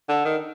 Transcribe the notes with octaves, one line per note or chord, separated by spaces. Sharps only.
D3
D#3